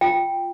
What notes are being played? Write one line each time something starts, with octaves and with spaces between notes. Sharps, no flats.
F4 G5